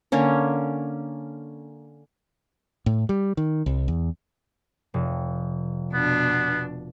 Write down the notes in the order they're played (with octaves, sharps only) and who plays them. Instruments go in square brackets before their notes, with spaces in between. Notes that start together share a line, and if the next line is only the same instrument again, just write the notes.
[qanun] D3 A#3 C#4
[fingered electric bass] A2
G3
D#3
C2
E2
[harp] F1
[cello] B2 D4 [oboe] B3